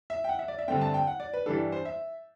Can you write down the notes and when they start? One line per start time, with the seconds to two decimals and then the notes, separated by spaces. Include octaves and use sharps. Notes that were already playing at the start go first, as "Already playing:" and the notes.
0.10 E5
0.24 G5
0.29 F#5
0.39 E5
0.48 D5
0.59 E5
0.68 G2 D3 A3 C4 G5
0.81 A5
0.94 G5
1.07 F#5
1.20 D5
1.34 B4
1.46 G2 E3 G3 D4 A4
1.72 C5
1.85 E5